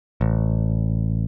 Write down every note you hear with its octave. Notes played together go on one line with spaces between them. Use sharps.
A1